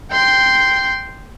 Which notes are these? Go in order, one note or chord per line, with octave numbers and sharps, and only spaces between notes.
G5 C6